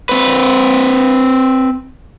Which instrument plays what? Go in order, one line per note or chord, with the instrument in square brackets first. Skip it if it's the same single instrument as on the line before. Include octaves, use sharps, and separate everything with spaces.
[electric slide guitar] C4 B4